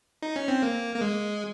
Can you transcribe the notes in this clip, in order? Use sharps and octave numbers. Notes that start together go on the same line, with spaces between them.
D#4
C#4
C4
A#3
A#3
G#3